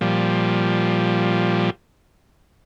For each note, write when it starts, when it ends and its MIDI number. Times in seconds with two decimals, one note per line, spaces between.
0.01 1.70 46
0.01 1.70 53
0.01 1.70 55